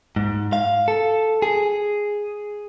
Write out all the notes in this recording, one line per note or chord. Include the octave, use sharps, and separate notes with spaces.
G#2
F5
A4
G#4